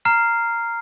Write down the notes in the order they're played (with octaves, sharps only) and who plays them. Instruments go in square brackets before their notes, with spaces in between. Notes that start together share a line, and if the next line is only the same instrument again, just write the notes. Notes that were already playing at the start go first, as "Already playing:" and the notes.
[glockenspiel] A#5 F6 C7